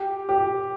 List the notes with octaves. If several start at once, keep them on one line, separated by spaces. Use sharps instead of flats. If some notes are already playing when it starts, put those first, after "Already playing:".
Already playing: G4
G4